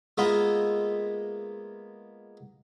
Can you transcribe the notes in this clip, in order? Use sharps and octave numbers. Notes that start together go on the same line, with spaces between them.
G#3 A#3 B3 F4 D#5 E5